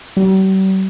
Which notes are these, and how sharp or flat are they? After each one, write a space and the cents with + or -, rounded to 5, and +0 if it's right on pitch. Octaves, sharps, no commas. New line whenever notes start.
G3 -45